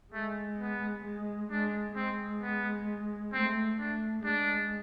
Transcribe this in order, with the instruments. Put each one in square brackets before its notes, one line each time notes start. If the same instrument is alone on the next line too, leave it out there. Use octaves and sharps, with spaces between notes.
[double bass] G#3 [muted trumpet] A3
[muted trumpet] B3
[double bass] G#3
[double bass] G#3 [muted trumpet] D4
[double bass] G#3 [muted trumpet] C4
[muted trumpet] B3
[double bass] A3 [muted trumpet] C4
[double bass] A3 [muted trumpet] D4
[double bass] G#3 [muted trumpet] D4